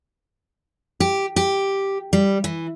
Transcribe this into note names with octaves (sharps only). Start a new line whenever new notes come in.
G4
G4
G3
E3